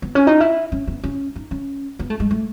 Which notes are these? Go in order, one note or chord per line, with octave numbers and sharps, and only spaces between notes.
B3
C#4
D#4
E4
C#4
B3
C#4
D#4
C#4
B3
A3
G#3
A3